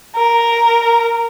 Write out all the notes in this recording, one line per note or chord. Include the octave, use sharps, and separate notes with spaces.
A#4